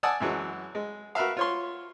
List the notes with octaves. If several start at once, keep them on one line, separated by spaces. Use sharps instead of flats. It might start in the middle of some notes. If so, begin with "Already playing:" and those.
D5 F#5 G#5 A5 D#6 E6
F#2 E3 F#3 G#3
G#3
F#4 A#4 B4 E5 F5
F4 C#5 C6